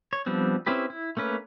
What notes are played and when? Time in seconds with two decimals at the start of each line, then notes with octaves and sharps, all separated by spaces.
0.13 C#5
0.26 F3 G3 B3 C4 D4
0.66 C4 C#4 E4 G4 B4
0.90 E4
1.17 A3 A#3 C#4 B4